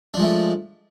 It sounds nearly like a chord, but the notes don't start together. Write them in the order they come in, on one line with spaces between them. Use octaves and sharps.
D4 F3 G#3 A3